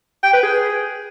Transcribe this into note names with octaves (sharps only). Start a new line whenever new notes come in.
G5
B4
G#4